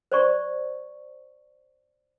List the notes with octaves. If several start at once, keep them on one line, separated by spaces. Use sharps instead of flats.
C5 D5 C#6